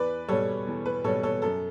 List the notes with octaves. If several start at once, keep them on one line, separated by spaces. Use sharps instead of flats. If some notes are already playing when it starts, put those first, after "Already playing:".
Already playing: E2 B4 D5
B2 G3 A4 C#5
E2
B4
B2 G3 A4 C#5
A4 C#5
F#2 A4